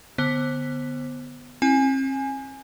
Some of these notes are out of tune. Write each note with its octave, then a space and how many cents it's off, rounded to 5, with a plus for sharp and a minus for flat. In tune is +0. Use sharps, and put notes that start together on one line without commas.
D3 +0 B3 +0 C5 +25
C4 +40 E4 -10 G#5 +0